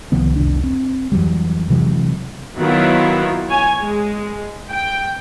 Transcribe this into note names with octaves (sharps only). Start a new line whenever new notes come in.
C2 D#3 F3 B3
F1 C2 D4
C4
F2 E3 F#3 G3
C3 E3 F#3 G#3
D#3 F#3 B3 E4 F4
C#5 G#5
G#3
G5